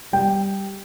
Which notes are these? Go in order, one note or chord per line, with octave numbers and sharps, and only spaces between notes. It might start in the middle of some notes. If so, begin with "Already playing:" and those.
G3 G5